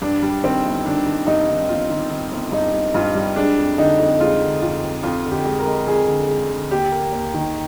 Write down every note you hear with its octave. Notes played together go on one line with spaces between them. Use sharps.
G2 D4
G3
D#3 C4
G1
D#3 D4
D#3
G2 D#4
D#3
G1 F4
D#3
D#3
G1
G2 D#4
G2
G2 F4
G3
G#3 D4
F2
D3 D#4
F2
G#3 F4
D3
F2 F4
F2
F2 F4
D3
G4
G#3
A#4
G#3
F2 G#4
D3
G#3
D3
D#2 G4
A#3
D#2
D#3